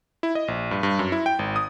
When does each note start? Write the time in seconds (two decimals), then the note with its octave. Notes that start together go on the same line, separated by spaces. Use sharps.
0.23 E4
0.35 D#5
0.48 A#1
0.71 G2
0.83 G2
0.99 F#2
1.12 E4
1.26 G5
1.39 G#1
1.56 D#6